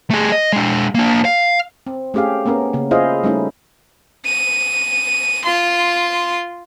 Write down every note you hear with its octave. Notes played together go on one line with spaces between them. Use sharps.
A3 G#4
D#5
G#3 D4
A#3 D4
F5
C4
A3 C#4 G4 G#4 F5
A#3 B3 C#4 A#4
C#3 A#3
E4 F4 G#4 C5 D#5 F5
G3 A3 C#4 D#4 E4
D#7
F4 C6